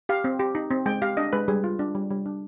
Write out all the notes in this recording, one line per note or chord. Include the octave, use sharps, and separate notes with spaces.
G4 F5
C4
G4
D#4
C4
G#3 G5
G4 F5
D4 D#5
G#3 B4
G3 G#4
F4
D4
G3
G3
D4